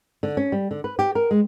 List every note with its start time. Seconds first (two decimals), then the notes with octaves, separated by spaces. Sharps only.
0.23 D3
0.37 C#4
0.52 G3
0.71 D3
0.84 B4
0.99 G4
1.15 A#4
1.31 G#3